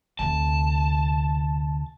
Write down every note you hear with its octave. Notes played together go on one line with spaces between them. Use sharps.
D2 C3 A5